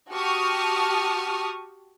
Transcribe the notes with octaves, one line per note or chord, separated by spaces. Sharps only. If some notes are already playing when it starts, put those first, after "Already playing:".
F#4 G4 A5 C#6 D#6 F6